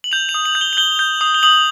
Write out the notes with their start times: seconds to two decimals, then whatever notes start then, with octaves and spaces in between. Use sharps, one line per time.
0.04 F#7
0.12 G6 F7
0.29 F7
0.34 D#6
0.45 F#7
0.55 G6
0.61 G7
0.73 F#7
0.77 G6 G7
0.99 G6
1.21 D#6
1.34 G7
1.43 D#6 F#7